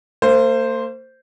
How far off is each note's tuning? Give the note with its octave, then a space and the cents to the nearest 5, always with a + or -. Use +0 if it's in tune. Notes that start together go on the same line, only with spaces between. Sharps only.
A#3 -40 C5 +0